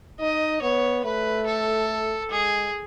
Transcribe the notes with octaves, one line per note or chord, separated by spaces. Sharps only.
D#4 D#5
B3 C#5
A3 B4
A4
G#3 G#4